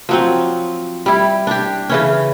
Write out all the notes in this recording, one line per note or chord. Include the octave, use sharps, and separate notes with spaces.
F3 F#3 C4
G3 E4
D4 G4
C#3 E3 C#4